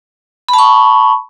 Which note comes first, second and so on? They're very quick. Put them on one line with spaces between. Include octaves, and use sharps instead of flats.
B5 A5 C#6